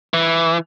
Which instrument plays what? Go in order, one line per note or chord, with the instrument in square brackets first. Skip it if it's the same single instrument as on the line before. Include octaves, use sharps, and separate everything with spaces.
[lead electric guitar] E3